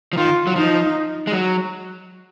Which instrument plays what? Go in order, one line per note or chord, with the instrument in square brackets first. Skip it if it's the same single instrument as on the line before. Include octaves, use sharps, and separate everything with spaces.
[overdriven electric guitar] F3
[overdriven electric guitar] D#3 [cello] F4
[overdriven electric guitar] F#3
[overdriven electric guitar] F3 [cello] D#4
[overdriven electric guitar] G#3
F#3